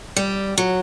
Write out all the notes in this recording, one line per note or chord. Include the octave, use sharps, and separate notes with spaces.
G3
F#3